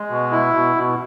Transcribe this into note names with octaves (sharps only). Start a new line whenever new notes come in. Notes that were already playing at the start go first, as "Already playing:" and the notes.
Already playing: G#3
B2
E4
B2
B2